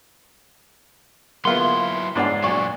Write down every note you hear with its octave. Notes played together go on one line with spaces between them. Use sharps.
F#3 A#3 B3 E4 F4 C6
G#2 D4 C#5 F#5
A#2 F#3 D4 D5 C#6